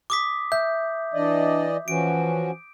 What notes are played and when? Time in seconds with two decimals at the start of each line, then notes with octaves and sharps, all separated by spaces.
0.10 D6 D#6 B6
0.52 E5 G6
1.14 E3 D4 D5 D#5
1.88 E3 F3 C#4 F#4 D7